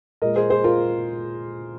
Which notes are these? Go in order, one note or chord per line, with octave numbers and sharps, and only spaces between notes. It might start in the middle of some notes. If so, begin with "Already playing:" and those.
A#2 G#3 A#4 D#5
G#4 C5
G#4 C5
F4 A#4